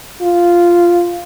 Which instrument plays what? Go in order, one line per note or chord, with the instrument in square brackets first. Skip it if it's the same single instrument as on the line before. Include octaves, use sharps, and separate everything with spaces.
[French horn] F4